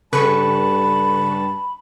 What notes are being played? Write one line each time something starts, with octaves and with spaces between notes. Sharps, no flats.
G2 C#3 G3 A4 B4 A5 B5 C#6